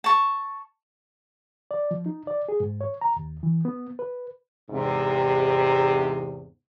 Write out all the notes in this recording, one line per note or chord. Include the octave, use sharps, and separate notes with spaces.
A5 C#6
D5
F3
D#4
D5
G#4
G#2
C#5
A#5
D#2
E3
B3
B4
E2 G#2 C3